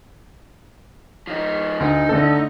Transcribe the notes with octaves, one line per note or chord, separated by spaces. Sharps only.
F3 D#4
D2 D#4
D3 A3 A4